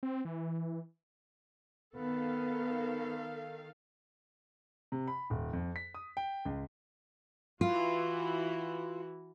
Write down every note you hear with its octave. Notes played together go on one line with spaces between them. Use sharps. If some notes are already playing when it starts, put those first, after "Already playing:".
C4
E3
D#3 B3 A4 F5
C3
B5
D#1
F2
B6
D#6
G5
C#2
E3 F4 F#4